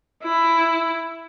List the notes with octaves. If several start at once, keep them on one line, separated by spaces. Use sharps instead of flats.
E4